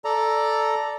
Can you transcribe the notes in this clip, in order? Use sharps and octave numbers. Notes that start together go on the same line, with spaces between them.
A4 D5 A#5